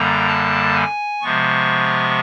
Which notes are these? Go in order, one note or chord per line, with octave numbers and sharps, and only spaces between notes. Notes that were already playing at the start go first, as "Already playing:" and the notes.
Already playing: F#2 D3 G3 A#3 A#5
A5
G#5
C3 F3 G#3 B3 C#6